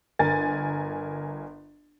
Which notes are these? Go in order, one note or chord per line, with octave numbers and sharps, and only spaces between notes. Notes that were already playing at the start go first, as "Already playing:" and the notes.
G1 A#4 G#5 A6